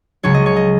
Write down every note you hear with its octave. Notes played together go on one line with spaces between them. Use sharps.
C#2 C#3 F#3 C#4 C#5
D#5
C#5
D#5